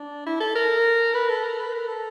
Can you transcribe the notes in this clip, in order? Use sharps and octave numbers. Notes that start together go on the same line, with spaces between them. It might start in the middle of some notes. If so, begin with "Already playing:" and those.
Already playing: D4
E4
A4
A#4
B4
A4
A#4
B4
A#4
A4